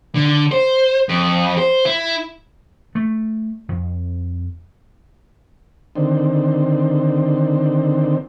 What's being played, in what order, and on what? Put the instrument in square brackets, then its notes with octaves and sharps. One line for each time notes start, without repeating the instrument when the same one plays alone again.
[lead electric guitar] D3
C5
F2
C5
E4
[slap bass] A3
F2
[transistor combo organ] D3 D#3 C4